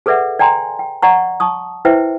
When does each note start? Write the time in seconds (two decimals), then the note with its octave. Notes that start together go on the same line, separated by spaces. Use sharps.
0.06 G#4 A4 B4 D5 E5 F#5
0.39 D5 G5 G#5 A#5 C6
0.79 G5
1.02 D5 D#5 F#5 A#5 C#6
1.40 A5 C#6 D#6
1.85 E4 B4 C5 E5 G5